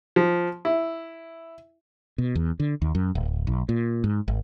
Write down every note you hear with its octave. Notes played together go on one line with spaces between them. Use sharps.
F3
E4
B2
E2
D3
D#2
F#2
D1
B1
A#2
G#2
G#1